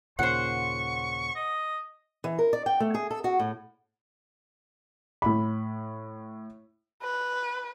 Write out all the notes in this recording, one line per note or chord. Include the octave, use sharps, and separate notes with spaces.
D#2 A#2 C#3 C5 F#5 C#6
D#5
E3
A#4
D5
G5
A3
G#4
A4
F#4
A2
A2 B5
B4